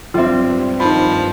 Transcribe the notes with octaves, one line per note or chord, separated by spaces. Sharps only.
G2 G3 C4 F4 E5
D#3 F3 B5